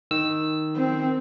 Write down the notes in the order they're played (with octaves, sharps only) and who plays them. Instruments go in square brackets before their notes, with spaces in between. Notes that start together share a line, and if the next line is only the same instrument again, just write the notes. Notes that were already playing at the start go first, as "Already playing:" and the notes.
[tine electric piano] D#3 E6
[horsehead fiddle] C4